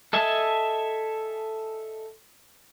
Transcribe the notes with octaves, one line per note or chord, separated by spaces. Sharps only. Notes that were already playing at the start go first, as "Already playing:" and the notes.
A4 D#5 E5 G#5 A5